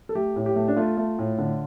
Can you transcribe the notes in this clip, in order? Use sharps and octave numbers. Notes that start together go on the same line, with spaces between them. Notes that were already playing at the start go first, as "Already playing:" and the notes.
A4
A3 G4
A2
G4
A3
D4
A3 F4
A3
A2
D3